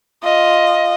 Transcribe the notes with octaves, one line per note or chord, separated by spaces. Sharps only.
F4 D#5